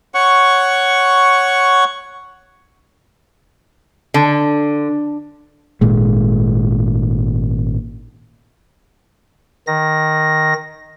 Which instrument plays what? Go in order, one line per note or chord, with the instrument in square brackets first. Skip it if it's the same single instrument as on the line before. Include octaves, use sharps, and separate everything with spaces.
[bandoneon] C#5 F#5 C#6
[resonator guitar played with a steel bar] D3
[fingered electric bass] G#1 A#2 G#3
[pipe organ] D#3 A#6